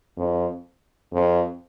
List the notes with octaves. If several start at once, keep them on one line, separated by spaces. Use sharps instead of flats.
F2
F2